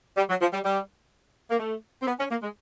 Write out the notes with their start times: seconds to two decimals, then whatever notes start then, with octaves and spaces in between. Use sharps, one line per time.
0.17 G3
0.29 F#3
0.41 F3
0.53 G3
0.65 G3
1.51 A#3
1.59 A3
2.02 C4
2.07 B3
2.19 C#4
2.31 A#3
2.42 G#3